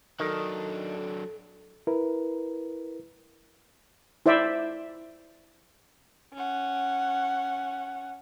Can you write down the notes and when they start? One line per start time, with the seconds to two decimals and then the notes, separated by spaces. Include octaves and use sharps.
0.20 D#3 F#3 D4 A4
1.87 E4 A#4 B4
4.26 E4 C5 D5 E5
6.34 C#4 F#5